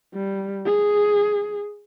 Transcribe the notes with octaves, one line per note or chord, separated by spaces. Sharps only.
G3
G#4